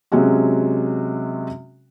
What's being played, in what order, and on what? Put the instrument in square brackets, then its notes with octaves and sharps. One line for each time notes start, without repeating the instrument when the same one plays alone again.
[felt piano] C3 F#3 G#3 C#4 F#4